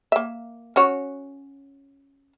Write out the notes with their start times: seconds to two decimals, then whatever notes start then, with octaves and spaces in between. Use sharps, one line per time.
0.12 A#3 E5
0.76 C#4 F#4 C#5